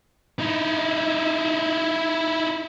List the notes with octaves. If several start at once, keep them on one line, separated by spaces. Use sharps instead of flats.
D#4 E4